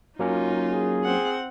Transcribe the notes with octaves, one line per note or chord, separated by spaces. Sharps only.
F#3 A#3 C#4 D#4 F4
G#4
C4 F#5